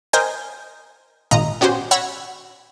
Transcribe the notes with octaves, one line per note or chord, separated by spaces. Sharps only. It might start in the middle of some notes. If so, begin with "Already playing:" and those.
A#4 C5 D#5 G5 G#5
G#1 A#2 D#5 A#5
B3 C#4 F#4 G4 C5
C#5 F#5 B5 E6 G#6 A#6